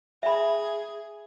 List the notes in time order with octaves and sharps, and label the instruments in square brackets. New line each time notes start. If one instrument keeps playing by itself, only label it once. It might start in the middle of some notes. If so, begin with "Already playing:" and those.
[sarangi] G#4 [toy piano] E5 B5